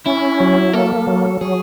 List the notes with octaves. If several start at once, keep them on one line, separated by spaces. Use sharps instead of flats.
C#4 E4
F#3
A#3 A4
F#3
F#3 G#4